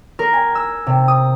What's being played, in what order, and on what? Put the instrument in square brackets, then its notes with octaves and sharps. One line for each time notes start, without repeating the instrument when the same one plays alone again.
[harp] A#4
G#5
E6
C3
D#6